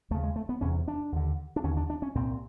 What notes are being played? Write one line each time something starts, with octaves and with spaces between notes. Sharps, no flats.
D#2 C#3 A3
G#3
A3
B3
E2 C3 C#4
D4
D#2 D3
D4
D#2 D3 C#4
D4
D4
C#4
C2 A#2 C4